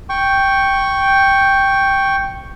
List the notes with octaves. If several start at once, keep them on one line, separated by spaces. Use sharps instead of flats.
G5 C#6